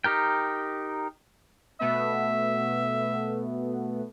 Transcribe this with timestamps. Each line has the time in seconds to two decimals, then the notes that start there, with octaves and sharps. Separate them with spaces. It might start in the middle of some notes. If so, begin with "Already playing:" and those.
0.04 D#4 G4 A#4 G5
1.81 B2 A3 B3 E5